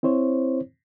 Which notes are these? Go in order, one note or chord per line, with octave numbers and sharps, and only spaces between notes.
C4 E4 C5 C#5